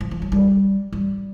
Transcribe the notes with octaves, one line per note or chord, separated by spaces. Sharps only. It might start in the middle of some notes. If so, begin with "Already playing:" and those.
F3
F3
F#3
G3
G3